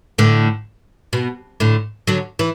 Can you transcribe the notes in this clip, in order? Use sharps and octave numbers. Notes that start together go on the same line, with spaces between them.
A2 D3
B2
A2 D3
D3 F#3
E3